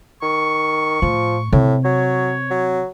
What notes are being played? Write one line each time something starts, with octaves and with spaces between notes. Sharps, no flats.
D#3 C#6
A2 F3
A2 C3
F#3 C#5
F#3